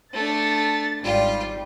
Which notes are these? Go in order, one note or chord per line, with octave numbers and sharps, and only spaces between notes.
A3 D4 A6
G#1 G3 F4